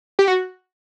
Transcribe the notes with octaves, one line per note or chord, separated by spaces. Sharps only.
G4
F#4